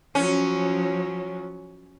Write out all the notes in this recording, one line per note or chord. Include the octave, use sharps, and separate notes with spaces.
F3 F#3 C#4